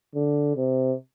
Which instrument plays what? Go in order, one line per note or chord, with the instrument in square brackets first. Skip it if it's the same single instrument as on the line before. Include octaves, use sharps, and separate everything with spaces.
[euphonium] D3
C3